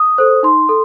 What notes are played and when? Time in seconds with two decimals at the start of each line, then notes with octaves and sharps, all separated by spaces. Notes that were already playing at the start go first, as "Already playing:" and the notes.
Already playing: D#6
0.18 A4 C5
0.43 D#4 C6
0.69 A4